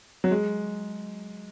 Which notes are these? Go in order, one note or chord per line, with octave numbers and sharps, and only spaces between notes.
F#3
G#3